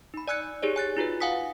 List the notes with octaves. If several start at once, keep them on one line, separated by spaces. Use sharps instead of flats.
D#4 B5
D5 G#5 E6 F#6 G#6 C#7
D#4 G4 G#4 C#5 D5
G#5 F#6 A6
D#4 F4 F#4 B4
F5 F#5 G#5 D#6 B6